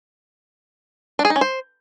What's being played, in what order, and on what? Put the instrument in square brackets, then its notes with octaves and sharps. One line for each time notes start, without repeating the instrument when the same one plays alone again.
[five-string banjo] D4
G#4
D#4
C#4
C5